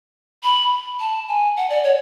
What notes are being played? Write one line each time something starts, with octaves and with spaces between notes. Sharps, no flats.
B5
A5
G#5
F#5
D5
C#5